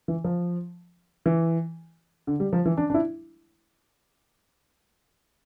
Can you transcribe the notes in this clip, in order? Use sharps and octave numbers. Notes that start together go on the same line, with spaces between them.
E3
F3
E3
D3
G3
F3
E3
D4
D4
E4